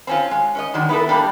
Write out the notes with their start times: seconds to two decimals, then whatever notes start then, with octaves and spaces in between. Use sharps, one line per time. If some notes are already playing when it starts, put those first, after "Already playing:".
0.07 C4 C#4 F4
0.31 G#3
0.55 C#4 C#5 D#5
0.74 D#3 F#3 G#3 D4
0.89 B3 E4 A4 A#4
1.08 G3 A#3 D4 G4